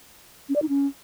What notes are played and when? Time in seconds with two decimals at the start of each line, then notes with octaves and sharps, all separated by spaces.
0.49 C#4
0.56 D5
0.62 D#4
0.69 C#4